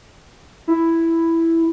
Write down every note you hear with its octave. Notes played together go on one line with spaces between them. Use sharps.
E4